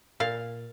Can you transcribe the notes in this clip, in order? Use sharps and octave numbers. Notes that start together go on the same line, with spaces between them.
A#2 F5